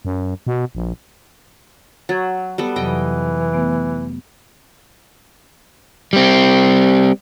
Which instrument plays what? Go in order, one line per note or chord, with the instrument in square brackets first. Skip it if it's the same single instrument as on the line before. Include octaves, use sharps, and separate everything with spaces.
[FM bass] F#2
B2
A#1
[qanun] F#3 [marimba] C#6 G#6 A6
[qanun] G3 B3 A4
[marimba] F2 C3 F#3 [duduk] E3 [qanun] D#5 G5
[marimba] A3 B3
[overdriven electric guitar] G3 C4